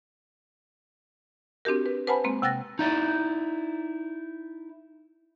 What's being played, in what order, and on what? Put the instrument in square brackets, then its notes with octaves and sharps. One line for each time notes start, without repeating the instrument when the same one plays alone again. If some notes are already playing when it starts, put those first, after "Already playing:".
[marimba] C4 D4 F#4 G4 A#4
B4
B4 C5 F#5 G#5 A5 B5
G#3 A#3 C4
C3 F#5 G5 F#6 A6 A#6
[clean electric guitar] D#4 E4 D5